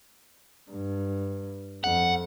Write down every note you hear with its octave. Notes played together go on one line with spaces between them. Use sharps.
G2
F2 F#5